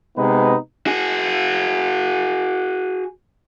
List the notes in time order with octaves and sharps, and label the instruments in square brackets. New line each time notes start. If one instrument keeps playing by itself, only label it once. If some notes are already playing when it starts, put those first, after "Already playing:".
[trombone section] C3 G#3 B3 D#4 B4
[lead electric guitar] F#4 G#4